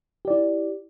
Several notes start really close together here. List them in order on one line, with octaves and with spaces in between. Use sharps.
G4 D5 E4